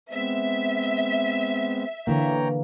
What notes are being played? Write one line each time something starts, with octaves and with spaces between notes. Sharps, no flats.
G#3 B3 C4 E5
D3 E3 A#3 C#5 G5 A#5